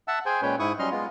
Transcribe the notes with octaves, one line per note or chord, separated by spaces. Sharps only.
E5 F#5 A5 E6
G#4 C5 G5 G#5
A#2 G#3 C#4 B4 C#5 G5
G#2 E4 C#6 D#6
F#3 G3 C#4 D#5 C6 F6
G#3 B3 F4